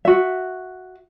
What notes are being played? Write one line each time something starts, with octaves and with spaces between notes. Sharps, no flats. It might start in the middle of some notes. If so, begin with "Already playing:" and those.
F#4 E5